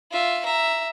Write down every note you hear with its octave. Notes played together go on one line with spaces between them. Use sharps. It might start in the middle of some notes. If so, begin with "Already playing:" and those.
F4 E5
E5 A#5